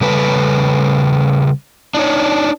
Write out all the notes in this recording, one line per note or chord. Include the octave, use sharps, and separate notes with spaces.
C#3 G3 A4 B4
D4 D#4 C#5